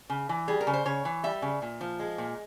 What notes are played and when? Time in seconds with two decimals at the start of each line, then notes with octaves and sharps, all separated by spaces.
0.10 C#3
0.29 E3
0.48 G3 G#4
0.61 A#4
0.67 C#3
0.73 C5
0.85 C#3 C#5
1.05 E3
1.23 G3 E5
1.42 C#3
1.62 A#2
1.81 F3
2.00 G#3
2.18 A#2